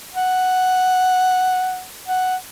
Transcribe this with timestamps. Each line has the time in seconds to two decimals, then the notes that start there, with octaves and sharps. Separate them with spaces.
0.14 F#5
2.08 F#5